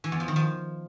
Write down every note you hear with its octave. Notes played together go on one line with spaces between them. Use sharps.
E3
E2
F3
D#3
F3